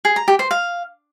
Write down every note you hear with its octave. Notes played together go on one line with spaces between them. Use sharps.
G#4
A#5
G4
C5
F5